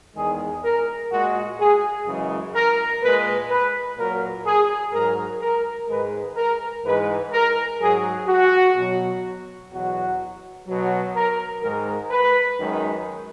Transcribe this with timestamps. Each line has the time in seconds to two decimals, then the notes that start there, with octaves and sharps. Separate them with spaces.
0.16 E2 D#3 G#3 G#4
0.63 A#4
1.11 A#2 G#3 F#4
1.60 G#4
2.07 F#2 C#3 E3 G#3
2.54 A#4
3.02 A#2 G#3 B4
3.50 B4
3.98 A#2 F#3 A#4
4.46 G#4
4.93 G#2 F#3 A#4
5.41 A#4
5.89 G#2 D#3 G#3 B4
6.37 A#4
6.84 G#2 E3 G#3 B4
7.32 A#4
7.80 G#2 F#3 G#4
8.28 F#4
8.76 B2 F#3
9.72 E2 B2 F#3 F#4
10.67 B2 F#3
11.14 A#4
11.63 G#2 D#3 G#3 A#4
12.10 B4
12.58 F#2 D#3 G#3